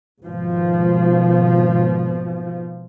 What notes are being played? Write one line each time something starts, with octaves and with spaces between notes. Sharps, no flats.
G#1 B2 F3